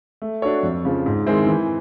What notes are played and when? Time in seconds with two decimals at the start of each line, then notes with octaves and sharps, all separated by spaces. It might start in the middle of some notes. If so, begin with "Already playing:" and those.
0.22 A3
0.42 D4 F#4 A4 C#5
0.63 F2
0.85 C#3 F3
1.06 G#2
1.26 D#3 G#3 C4 E4
1.47 E3